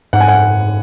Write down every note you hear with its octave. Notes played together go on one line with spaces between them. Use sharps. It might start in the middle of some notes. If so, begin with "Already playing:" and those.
G#2 F#5
G#5
F#5